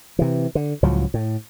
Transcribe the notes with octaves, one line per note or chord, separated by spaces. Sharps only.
C3 E3
D3
C#2 A2 F3 F#3
A2